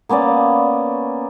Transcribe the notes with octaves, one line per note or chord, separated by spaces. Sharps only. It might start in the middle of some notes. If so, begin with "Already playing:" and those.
A#3 B3 C#4 D5